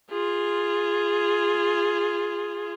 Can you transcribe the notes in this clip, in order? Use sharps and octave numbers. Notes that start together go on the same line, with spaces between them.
F4 G#4